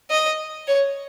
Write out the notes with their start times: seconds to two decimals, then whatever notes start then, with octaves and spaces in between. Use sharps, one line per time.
0.11 D#5
0.68 C#5